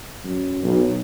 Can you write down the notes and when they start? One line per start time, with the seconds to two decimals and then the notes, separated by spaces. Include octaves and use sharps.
0.24 F#2
0.63 B1